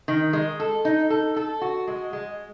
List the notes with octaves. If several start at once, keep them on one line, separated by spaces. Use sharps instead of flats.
D#3
G#3
A4
D#4
A4
A4
F#4
G#3
G#3